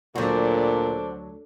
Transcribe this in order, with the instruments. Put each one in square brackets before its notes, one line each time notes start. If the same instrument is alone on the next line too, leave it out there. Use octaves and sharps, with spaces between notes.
[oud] D2 F#3 [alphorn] A#2 [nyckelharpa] D4 A4 [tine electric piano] F#4 C5 D5